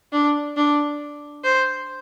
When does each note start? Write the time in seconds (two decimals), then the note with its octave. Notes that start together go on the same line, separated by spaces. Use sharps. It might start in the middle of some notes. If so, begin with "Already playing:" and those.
0.13 D4
0.57 D4
1.44 C5